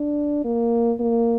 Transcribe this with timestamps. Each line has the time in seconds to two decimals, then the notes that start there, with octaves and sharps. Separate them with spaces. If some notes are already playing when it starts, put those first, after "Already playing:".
Already playing: D4
0.45 A#3
1.00 A#3